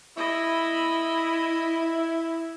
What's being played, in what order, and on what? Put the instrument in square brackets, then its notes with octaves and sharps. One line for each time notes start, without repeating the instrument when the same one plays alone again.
[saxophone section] E4 [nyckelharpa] D#5 B5